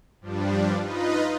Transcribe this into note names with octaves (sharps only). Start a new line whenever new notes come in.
G2 F3 G3 D4
D#4 F4 B4 D#5